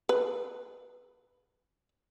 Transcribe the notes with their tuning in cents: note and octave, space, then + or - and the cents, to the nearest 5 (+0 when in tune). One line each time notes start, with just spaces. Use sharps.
B4 -5